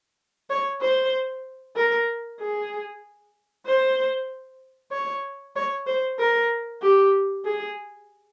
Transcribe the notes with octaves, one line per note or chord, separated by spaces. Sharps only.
C#5
C5
A#4
G#4
C5
C#5
C#5
C5
A#4
G4
G#4